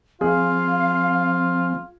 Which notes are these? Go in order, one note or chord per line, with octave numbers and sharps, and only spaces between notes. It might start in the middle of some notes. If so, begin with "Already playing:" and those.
F3 C4 F4 G#4 F5